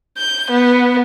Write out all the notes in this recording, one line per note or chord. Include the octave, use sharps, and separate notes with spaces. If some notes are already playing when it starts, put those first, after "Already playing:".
G6
B3